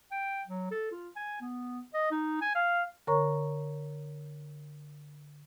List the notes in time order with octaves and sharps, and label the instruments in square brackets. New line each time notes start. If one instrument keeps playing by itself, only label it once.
[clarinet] G5
F#3
A4
F4
G#5
B3
D#5
D#4
G#5
F5
[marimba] D3 A#4 C#5 A#5 C#6